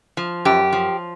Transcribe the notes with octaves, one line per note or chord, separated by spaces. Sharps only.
F3
F#2 G4
F3